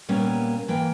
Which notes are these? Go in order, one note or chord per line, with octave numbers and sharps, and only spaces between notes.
A#2 G3 A#3 B3 C#4
E3 A#3 G5